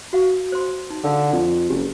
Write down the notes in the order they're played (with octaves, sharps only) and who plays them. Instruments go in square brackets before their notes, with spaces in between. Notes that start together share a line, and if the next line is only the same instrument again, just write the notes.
[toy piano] F#4 F5
C5 C6
D#4
[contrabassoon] D3 [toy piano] A4 F5
[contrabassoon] F2
[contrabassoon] F#1 [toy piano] G4